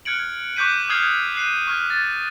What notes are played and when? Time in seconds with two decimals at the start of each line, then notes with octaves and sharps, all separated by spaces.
0.05 F6 F#6 G#6 C#7 D7 F#7
0.56 C#6 D6 F#6 G6 B6 D#7
0.89 D#6 F6 G#6 C7 F7
1.35 F#6 C7 D#7
1.67 C#6 F6 G#6
1.90 A6